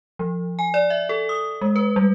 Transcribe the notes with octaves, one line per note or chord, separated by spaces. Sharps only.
F3
G#5
D5
E5
A4
D#6
G#3
B4
G3